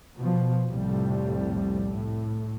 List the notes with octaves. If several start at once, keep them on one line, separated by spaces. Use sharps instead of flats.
B2 F3
C2 F2 A2 C3 G3
A2